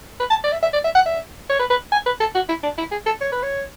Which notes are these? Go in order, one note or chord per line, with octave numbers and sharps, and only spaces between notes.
B4
A5
D5
E5
E5
D5
E5
F#5
E5
C#5
B4
B4
G#5
B4
A4
F#4
E4
D4
E4
G#4
A4
C#5
B4
C#5